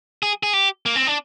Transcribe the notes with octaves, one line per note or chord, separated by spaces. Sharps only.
G#4
G#4
G4
A#3
C4
D4